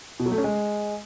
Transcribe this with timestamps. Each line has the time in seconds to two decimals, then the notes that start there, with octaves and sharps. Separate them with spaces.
0.20 B2
0.26 F#3
0.32 A3
0.38 C#4
0.44 G#3